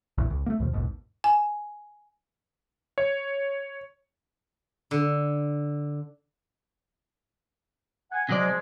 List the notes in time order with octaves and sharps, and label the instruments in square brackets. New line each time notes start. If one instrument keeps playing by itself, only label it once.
[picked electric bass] D1 A#1 E2
C#2
A3 A#3
D#2 B2 F3
A1 D#2 G#2 B2
[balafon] G#5
[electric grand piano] C#5
[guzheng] D3
[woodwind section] F#5 G#5
[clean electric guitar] C3 F#3 D5 [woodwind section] F3 G#3